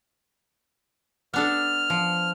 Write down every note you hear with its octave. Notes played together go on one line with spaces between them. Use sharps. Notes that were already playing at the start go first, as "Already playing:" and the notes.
B3 D4 A4 F6
F3